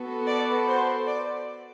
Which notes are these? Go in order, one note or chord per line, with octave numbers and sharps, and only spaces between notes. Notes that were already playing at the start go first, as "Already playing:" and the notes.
Already playing: B3 F#4 A4
D5
C5
D5